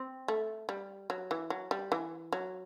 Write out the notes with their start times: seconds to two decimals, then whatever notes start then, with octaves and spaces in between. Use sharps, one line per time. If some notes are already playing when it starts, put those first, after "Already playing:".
Already playing: C4
0.28 A3
0.69 G3
1.10 F#3
1.31 E3
1.50 F#3
1.71 G3
1.92 E3
2.32 F#3